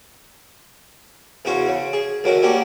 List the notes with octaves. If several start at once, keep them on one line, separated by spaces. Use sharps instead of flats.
E2 C#3 C#4 F#4 C5
C#3
G#4
D2 D#3 F#3 C#4 A#4
G3 A#3 C#4 D4 F#5